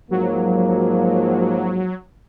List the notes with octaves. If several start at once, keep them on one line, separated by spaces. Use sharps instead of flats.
G#2 F3 F#3 A#3